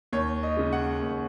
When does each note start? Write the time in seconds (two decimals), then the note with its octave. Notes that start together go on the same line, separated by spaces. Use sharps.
0.13 D#2 C#5
0.43 D#5
0.57 C#3 G#3
0.72 F#5
1.02 D#2